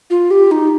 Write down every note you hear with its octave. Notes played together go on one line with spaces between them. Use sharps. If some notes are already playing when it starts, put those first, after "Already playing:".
F4
G4
D#4